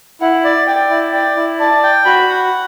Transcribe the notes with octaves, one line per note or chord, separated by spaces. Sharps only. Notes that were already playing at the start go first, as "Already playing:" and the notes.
E4 F#5
D5
D5 G5
E4
D5 G5
E4
D5 A5
G5
F#4 B5
F#5